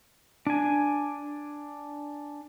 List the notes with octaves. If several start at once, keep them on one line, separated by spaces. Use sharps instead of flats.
D4 G#5